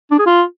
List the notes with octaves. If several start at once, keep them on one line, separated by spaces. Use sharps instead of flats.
D4
G#4
F4